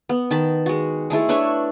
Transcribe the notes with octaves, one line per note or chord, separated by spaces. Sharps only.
B3
D#3 A5 B5
G#3 F#4
G#3 A3 E4 A4
D4 B4 C#5 E5